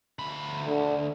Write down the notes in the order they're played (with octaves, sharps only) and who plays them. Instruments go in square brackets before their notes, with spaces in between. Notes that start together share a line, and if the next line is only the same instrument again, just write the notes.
[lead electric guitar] D2 B5
[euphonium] D3